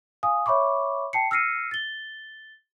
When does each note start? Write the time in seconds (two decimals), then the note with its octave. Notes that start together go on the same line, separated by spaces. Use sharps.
0.23 F5 G#5 D#6
0.46 C#5 E5 B5 C#6 D6
1.13 G5 A5 C7 C#7
1.31 E6 F6 A#6 C7 C#7 D#7
1.71 A6 G7